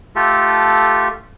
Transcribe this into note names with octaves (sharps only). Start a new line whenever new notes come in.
A3 F4 G4 A4